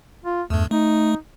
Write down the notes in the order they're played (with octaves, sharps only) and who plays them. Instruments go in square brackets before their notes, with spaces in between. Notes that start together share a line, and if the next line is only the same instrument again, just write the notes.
[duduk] F4
[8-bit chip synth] E2 G2 [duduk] A3
[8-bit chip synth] A3 [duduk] D#4